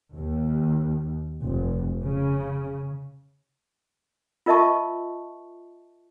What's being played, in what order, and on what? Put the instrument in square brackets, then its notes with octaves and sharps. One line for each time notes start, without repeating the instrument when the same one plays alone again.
[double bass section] D#2
F1
C#3
[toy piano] F4 A#4 D#5 E5 A5 C#6